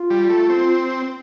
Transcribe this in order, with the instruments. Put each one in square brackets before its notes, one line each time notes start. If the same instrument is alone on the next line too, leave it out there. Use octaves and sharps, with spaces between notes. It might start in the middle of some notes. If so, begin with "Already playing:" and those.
Already playing: [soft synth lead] F4
[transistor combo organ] G3
A3
C4